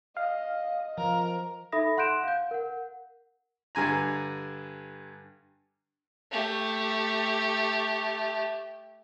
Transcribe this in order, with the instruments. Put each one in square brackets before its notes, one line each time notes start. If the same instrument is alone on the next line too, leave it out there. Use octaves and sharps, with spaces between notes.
[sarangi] D#5 [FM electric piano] F5
[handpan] F3 [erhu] A#4
[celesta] D#4 A4 E5 B5 D#6 A#6
F#5 C6 F#6 G6 D7 E7
F5 G6
A#4 F#5
[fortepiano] G2 D3 G#5 A#5
[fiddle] A3 G4